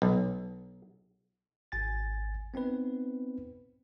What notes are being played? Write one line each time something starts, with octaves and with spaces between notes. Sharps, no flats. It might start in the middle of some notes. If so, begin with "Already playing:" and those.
B1
G#1 G#5 A6
B3 C4 D#4 B4